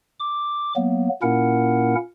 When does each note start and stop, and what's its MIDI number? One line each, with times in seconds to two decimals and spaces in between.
0.20 0.73 86
0.76 1.08 54
0.76 1.08 58
0.76 1.08 59
1.22 1.95 46
1.22 1.95 58
1.22 1.95 61
1.22 1.95 64
1.22 1.95 70
1.22 1.95 78